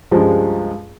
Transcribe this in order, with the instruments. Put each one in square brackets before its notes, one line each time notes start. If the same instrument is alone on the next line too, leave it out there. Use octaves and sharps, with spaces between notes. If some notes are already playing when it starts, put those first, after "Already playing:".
[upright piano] C#2 G2 F3 G3 G#3